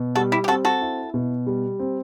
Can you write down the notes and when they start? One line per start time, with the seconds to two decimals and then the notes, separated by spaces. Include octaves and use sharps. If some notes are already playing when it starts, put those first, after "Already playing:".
Already playing: B2
0.15 G3 F#4 A4
0.32 E4 G4
0.44 G4
0.48 C4 F#4 A4
0.65 F#4 A4
0.81 E4
1.14 B2
1.47 G3
1.79 C4